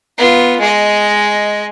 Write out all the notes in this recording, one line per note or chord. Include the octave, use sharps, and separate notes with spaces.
B3 F4
G#3 D#5